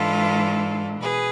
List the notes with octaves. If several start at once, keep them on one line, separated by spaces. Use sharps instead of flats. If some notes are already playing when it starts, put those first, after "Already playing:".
Already playing: G#2 E3 G#3 D4 F4 A4
B2 G#4 B4